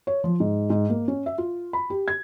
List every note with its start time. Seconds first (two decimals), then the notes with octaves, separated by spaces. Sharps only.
0.07 C#5
0.24 F3
0.40 G#2
0.70 G#2
0.90 A#3
1.08 C#4
1.26 E5
1.38 F4
1.73 B5
1.90 G4
2.08 G#6